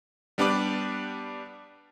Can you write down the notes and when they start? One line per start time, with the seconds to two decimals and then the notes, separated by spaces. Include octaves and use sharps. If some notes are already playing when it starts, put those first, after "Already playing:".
0.38 G3 B3 D4 G4 B4 D5